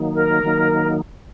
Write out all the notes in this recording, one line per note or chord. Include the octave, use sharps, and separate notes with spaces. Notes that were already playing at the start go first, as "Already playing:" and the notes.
Already playing: D#3 F#3 A#3 D#4
A#4
D#3 F#3 A#3 D#4